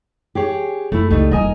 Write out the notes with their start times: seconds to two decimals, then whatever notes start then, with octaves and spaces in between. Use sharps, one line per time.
0.35 G4 G#4 C#5
0.92 F#2 A3 E4
1.10 C#2 G3 A3 D#4
1.31 D#1 E2 A#4 D#5 G#5